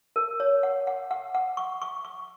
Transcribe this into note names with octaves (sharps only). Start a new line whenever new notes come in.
A#4
C#5
F#5
F#5
F#5
F#5
C#6
C#6
C#6